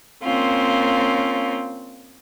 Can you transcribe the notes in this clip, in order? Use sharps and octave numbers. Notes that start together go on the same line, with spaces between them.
A#3 C4 C#4 F4